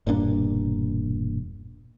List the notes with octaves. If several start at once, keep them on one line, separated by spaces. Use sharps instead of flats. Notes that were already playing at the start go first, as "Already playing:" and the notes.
E1 G2 A#2 D4